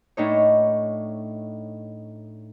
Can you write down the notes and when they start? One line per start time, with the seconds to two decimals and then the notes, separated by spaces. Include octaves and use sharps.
0.17 A2 D4 D#4 C#5